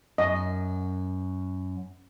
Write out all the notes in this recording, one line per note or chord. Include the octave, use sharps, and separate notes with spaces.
F#2 D#5